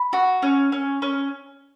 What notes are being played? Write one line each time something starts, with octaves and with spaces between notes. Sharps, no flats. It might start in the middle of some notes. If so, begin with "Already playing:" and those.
Already playing: B5
F#4
C#4
C#4
C#4